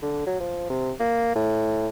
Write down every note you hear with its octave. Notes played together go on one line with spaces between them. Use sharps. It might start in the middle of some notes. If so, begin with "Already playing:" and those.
D3
F#3
F3
C3
A#3
A2